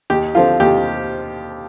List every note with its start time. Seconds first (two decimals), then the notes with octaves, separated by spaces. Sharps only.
0.10 D#2 G4
0.35 D3 F3 C4 F4
0.60 D#2 G4